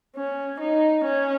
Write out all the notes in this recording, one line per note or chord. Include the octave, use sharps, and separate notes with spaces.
C#4
D#4
C#4